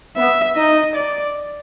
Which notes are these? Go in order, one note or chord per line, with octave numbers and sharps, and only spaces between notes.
B3 E5
D#4 D#5
D5